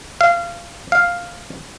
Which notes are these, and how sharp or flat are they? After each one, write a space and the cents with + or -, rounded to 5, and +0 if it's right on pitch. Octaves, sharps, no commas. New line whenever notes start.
F5 -20
F5 +5